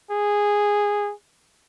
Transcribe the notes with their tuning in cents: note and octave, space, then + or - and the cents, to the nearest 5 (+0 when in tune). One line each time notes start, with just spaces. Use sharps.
G#4 -10